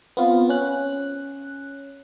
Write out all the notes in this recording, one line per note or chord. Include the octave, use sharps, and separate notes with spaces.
B3 C4 F4
C#4 F#6